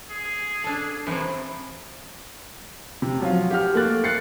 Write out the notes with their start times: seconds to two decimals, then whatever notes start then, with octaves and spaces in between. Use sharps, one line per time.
0.10 G#4
0.64 D4 A4
1.07 F#2 C3 E3
3.02 C3
3.20 F3 F#3 F4
3.50 G4 F#5 F6
3.74 A3 A#3 F#6 A6
4.04 F#6 A6 C7 C#7